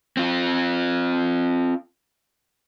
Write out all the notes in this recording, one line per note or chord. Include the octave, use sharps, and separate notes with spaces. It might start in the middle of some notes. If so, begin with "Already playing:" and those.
C4 F4